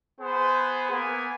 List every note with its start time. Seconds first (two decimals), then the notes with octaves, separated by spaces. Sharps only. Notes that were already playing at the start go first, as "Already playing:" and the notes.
0.20 B3 G#4 B4 C5
0.91 A#3 B3 G#5